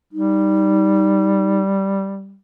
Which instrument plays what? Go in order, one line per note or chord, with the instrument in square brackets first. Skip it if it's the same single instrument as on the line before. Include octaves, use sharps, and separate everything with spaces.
[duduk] G3 [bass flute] D#4